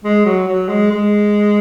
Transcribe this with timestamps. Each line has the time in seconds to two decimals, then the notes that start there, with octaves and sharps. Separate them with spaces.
0.04 G#3
0.26 F#3
0.48 F#3
0.69 G#3
0.91 G#3